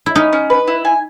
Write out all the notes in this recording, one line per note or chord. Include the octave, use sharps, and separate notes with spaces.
E4
C#4 D#4
C#4
B4
E4
G#5